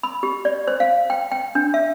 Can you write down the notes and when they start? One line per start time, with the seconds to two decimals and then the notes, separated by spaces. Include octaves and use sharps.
0.03 B5
0.23 G4
0.45 D5
0.68 C5
0.80 F5
1.10 G5
1.32 G5
1.55 D4
1.74 E5